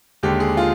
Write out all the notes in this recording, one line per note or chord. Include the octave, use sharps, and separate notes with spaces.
D#2 D3 G#3 G4
G#4
F4